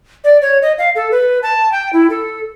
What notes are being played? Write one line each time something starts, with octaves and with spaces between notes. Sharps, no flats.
D5
C#5
D#5
F5
A4
B4
A5
G5
E4
A4